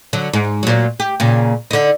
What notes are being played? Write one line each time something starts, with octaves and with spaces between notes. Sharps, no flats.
D3 F#3
G#2
A#2 F#3
G4
A#2 C#3
D3 D#4